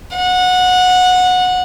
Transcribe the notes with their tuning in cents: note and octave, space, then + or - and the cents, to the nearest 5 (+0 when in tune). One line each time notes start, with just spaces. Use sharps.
F#5 -20